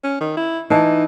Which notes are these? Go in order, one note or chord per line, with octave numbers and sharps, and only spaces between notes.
C#4
D#3
E4
E3 D#4 A5